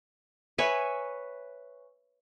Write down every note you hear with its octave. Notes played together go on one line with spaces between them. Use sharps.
B4 C#5 E5 G#5